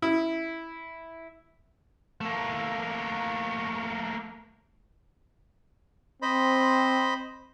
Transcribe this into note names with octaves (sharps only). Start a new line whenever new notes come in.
E4
A3 A#3
C4 C5 D#5 B5